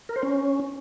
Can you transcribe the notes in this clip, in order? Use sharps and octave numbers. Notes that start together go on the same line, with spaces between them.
A#4
C5
C#4